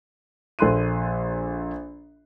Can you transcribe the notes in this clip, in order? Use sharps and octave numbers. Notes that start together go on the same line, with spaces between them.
A#1 A4 C6 F#6 D#7